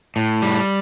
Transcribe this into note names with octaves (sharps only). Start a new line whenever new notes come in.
A2
G3